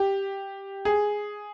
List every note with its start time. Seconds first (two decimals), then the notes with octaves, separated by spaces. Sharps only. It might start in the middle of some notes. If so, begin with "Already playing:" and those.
Already playing: G4
0.85 G#4